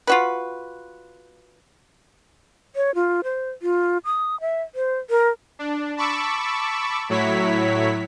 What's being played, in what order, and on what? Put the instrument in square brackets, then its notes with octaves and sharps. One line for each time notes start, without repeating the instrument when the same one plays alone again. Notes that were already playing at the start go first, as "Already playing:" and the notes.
[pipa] F4 F#4 B4
[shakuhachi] C#5
F4
C5
F4
D#6
E5
C5
A#4
[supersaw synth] D4
A5 B5 C#6 D6 E6
A2 F#3 E4 C#5 B6